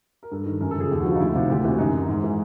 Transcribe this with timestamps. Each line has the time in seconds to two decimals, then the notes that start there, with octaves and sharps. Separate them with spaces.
0.23 A#4
0.31 G2 A4
0.46 D#3
0.61 F#2 A#4
0.71 A4
0.76 C#3 F3 G#4
0.91 D#2 G4
1.00 F#4
1.05 D3 F3 F4
1.15 D#4
1.20 D2 E4
1.34 C3 D#3 F4
1.49 D2 G4
1.64 C3 E3 F#4
1.78 F#2 D#4
1.94 D#3
2.08 G#2
2.24 E3